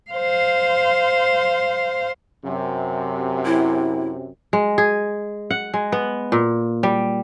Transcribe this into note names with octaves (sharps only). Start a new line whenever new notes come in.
C5 F5
F#2 C3
E4
G#3
G#4
F#5
G#3
B3
A#2
G3